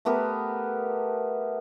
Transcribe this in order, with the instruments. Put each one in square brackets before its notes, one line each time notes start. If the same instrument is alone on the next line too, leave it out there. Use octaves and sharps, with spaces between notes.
[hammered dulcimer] A3 B3 G4 A#4